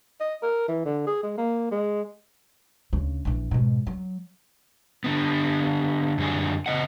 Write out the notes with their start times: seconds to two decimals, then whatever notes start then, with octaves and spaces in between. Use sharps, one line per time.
0.20 D#5
0.42 A#4
0.68 E3
0.85 D3
1.06 G#4
1.23 G#3
1.37 A#3
1.71 G#3
2.93 D2 C#3
3.25 A#1 E3
3.51 G#2 B2
3.87 F#3
5.04 D3 B3
6.18 F#2 D3 G3 G#4
6.66 C#3 E3 D#5 F#5